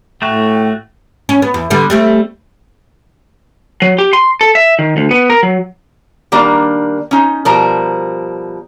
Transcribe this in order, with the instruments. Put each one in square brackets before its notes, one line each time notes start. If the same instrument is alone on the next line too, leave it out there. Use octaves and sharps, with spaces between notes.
[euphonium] A2 [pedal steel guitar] A3 F#4 [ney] G5
[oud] C#4
B3
E2
D3 G3 B3
G3 A3 C4
[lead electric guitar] F#3
G4
C6
A4
E5
D#3
D2
B3
A#4
F#3
[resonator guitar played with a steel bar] D#3 G3 A#3 D4
C#4 D#4
B2 F3 G3 A#4 C5 A#5